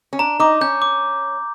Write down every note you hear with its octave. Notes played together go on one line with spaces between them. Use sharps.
C#4
D4 A#5
D#4 D6
C#4 G6
D6